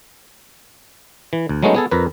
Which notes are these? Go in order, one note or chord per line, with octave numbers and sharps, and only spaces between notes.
E3
D2
F#3 G#3 A3 B3 C#4 D#4
B3 G#4 A4
F2 A#4 B4